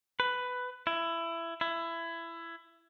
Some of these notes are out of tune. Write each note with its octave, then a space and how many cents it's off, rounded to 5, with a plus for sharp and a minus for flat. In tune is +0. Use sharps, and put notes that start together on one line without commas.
B4 +10
E4 +20
E4 +20